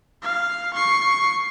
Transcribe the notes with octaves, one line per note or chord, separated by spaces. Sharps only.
F5
C#6 C7